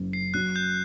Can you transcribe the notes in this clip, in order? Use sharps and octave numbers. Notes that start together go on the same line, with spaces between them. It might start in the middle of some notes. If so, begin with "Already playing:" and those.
Already playing: F#1 F#2
C7
F#3 F#6
G6